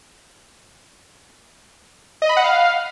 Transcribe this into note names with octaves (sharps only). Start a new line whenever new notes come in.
D#5
B5
F#5
F5